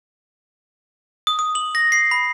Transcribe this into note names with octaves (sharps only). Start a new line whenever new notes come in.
D#6
D#6
F#7
A#6
C7
B5